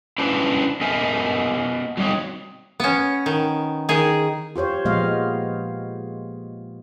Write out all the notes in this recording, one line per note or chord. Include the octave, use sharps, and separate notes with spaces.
C#4 D4 E4 B4 C5
B3 A#4 D#5 E5 G#5
F#3 G3 C4 D#4 C#5
B3 C#4
D#3
D#3 G#4
F4 G4 C5 C#5
A#2 F3 G#3 B3 D#5 F5